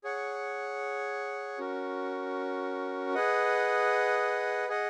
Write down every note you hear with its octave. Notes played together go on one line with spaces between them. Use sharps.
G#4 C#5 F#5
C#4 F#4 A#4
G#4 B4 D#5 F#5
G#4 D#5 F#5